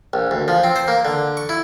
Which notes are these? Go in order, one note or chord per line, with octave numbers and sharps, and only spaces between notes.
A#1
D2
F3
C4
C5
A#3
D3
C#6
E4